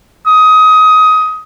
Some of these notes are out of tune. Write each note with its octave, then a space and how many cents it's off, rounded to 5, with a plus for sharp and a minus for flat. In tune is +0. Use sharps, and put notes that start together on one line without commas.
D#6 +20